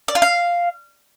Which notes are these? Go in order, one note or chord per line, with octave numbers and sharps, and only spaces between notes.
D5
F4
F5